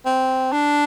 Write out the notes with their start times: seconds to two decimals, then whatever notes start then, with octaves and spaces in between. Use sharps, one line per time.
0.05 C4
0.52 D4